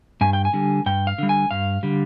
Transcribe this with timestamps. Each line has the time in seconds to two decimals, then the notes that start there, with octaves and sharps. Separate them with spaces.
0.21 G2 G#5
0.33 G5
0.45 G#5
0.53 D3 G3
0.86 G2 G5
1.07 F5
1.18 D3 G3
1.29 G#5
1.51 G2 F5
1.83 D3 G3